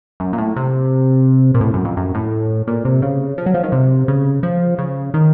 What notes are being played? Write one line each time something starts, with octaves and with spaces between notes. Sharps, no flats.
F#2
A#2
A2
C3
A#2
A2
F#2
F2
F#2
A2
A#2
C3
C#3
F3
F#3
F3
D#3
C3
C#3
F3
C#3
D#3